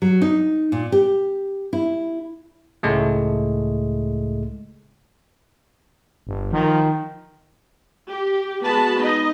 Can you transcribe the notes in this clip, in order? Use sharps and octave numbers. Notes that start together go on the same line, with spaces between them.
F#3
D#4
A#2
G4
E4
C#2 A2 G#3 A3
G1
D#3 F3
G4
G#3 B3 F#4 A5 B5
D#4 D#5